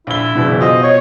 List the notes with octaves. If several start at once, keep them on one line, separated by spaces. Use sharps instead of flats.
A#1 E4 G7
F#1 B2 E3 D4
F4 F#4 C5 D#5
C#5